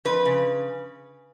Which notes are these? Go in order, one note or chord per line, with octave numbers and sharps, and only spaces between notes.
F2 B4
C#3